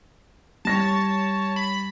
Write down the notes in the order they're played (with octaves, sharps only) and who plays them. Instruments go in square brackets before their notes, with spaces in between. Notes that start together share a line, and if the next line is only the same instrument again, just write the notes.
[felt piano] G3 A#6 [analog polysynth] C#5 A5
[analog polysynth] B5